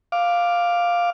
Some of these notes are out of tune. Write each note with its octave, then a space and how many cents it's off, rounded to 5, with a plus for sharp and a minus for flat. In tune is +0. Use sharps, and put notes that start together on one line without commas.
F5 +0 D6 +5